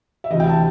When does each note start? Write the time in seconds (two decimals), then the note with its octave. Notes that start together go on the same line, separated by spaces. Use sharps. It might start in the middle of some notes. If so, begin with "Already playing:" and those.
0.24 E5
0.30 D2 C3 E3 D#5
0.40 G5
0.50 A5